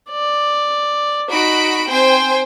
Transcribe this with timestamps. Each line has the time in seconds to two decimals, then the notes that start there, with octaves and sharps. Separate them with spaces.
0.10 D5
1.31 D#4 F#4 B5 D7
1.90 C4 C5 G5 G#5